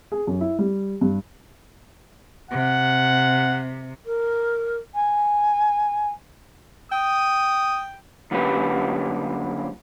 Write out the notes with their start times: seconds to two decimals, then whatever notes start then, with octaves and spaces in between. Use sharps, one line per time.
0.12 G#4
0.27 F#2
0.41 E4
0.59 G3
1.01 G2
2.51 C3 F#5
4.05 A#4
4.94 G#5
6.92 G5 D#6
8.31 F#2 D3 G3 A#3 C#4 B4